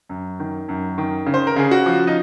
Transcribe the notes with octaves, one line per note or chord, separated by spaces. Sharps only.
F#2
D#3
F#2
D#3
C#3
C5
A#4
C#3 G#4
F#4
F3
D#4